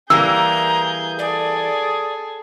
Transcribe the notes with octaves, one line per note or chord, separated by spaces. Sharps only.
E3 G3 A#3 G#4 A#5 E6 G6
G#4 A4 D5